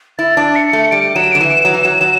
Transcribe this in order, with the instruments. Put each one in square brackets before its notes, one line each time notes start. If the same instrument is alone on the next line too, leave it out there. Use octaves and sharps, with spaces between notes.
[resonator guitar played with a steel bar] E4 [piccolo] A6
[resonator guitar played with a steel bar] D4
[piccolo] C#7
[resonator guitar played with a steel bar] A3
[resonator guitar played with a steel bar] G3 [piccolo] D7
[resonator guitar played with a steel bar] F#3 [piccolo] E7
[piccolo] D7
[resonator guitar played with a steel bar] D3
[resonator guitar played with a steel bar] E3 [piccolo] E7
[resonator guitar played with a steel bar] F#3
E3
F#3
F#3